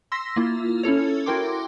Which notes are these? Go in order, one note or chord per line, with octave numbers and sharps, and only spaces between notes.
C6 E6 A#6 B6
A#3 E4 F4
C#4 E4 A4 C#5
E4 F#4 A#4 G5 C6 D6